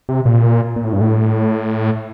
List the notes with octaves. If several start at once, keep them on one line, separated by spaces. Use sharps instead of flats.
C3
A#2
A#2
A2
G2
A2